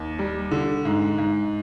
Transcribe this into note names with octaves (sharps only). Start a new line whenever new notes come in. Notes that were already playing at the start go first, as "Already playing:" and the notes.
Already playing: D#2
G3
D3
G#2
G#2